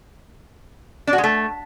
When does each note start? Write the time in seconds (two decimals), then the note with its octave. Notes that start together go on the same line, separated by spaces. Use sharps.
1.07 D4
1.13 F#4
1.18 G#3
1.24 A3